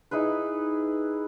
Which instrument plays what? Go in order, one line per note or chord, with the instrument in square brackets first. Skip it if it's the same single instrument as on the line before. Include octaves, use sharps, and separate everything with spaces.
[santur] D#4 E4 G#4 B4